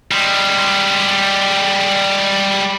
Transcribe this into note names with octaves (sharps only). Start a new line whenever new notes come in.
G3 G#3